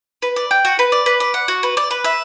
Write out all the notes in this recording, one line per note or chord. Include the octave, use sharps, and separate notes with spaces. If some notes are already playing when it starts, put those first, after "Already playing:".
B4
D5
G5
F#4
B4
D5
B4
D5
F#5
F#4
B4
D5
B4
E5